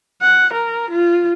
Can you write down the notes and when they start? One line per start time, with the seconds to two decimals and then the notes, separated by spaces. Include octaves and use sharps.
0.23 F#5
0.53 A#4
0.90 F4